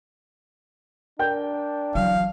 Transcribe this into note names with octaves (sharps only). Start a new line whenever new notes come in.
D4 A#4 G5 G6
E3 F#3 F5